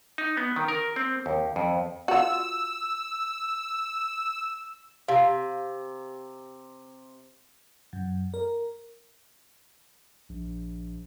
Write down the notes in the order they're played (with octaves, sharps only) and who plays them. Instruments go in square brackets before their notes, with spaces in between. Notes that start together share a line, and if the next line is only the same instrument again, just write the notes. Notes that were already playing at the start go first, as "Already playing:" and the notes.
[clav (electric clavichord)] D#4
B3
D#3
A#4
C4
D#2
F2
[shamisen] F4 F#4 [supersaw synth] E6
[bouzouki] C3 [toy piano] F5
[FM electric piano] F#2
A#4
[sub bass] A#1